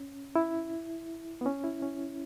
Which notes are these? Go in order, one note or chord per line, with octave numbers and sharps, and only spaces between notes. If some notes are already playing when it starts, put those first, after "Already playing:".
Already playing: C#4
E4
B3
C#4
E4
C#4